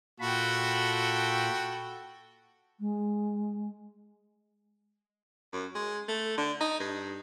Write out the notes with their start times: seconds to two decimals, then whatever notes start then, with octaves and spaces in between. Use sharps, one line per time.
0.20 A#2 F4 F#4 A4 G5 B5
2.80 G#3
5.52 F#2
5.75 G#3
6.08 A3
6.38 D3
6.60 D#4
6.80 G2